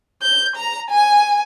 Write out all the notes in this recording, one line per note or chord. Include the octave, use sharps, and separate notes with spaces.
G6
A#5
G#5